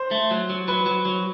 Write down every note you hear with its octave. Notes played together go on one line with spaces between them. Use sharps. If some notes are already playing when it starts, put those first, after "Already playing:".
Already playing: C5
A3
F#3
F#3
F#3 B4
F#3
F#3